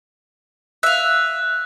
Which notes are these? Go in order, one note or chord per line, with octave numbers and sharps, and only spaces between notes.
E5 F5 F#6